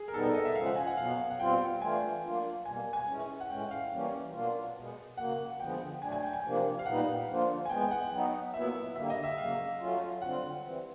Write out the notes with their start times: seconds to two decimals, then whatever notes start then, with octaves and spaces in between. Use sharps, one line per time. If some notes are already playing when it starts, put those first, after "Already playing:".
Already playing: G#4
0.08 A#4
0.14 B2 G3 B3 D#4 A4
0.24 A4
0.34 D#5
0.45 E5
0.55 C#3 F3 G#3 F5
0.66 F#5
0.76 G#5
0.87 F#5
0.97 B2 F#3 B3 F5
1.30 F#5
1.39 B2 G3 C4 F4 G5
1.81 E3 A3 D4 F4 G#5
2.23 F#3 A#3 D4 F4
2.65 B2 G3 A#3 G#5
2.93 G#5
3.07 E3 G#3 C#4
3.40 F#5
3.49 A2 E3 G#3 C#4 G5
3.71 F5
3.92 E3 G3 A#3 C#4
4.33 B2 F#3 A#3 D4 F4
4.76 B2 G#3 B3
5.17 C#3 F#3 A#3 F#5
5.60 D3 F3 G#3 B3 G5
6.02 B2 F#3 A3 D4 G#5
6.12 G#5
6.23 G5
6.33 G#5
6.43 C3 F3 A#3 D4
6.79 F5
6.86 A#2 G3 B3 D#4 F#5
7.28 D3 F3 A#3 D4 F4
7.65 G#5
7.69 E3 G#3 B3 G5
7.81 G5
7.91 F#5
8.11 F#3 B3 D#4
8.54 A#2 F#3 B3 E4 E5
8.96 D3 G3 A#3 E5
9.10 D#5
9.24 E5
9.38 C#3 F#3 A#3 F5
9.80 F#3 A3 C#4 F4
10.22 D3 G3 C4 F4 F#5
10.63 E3 G3 C4